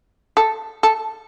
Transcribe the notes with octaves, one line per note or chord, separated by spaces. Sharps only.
A4
A4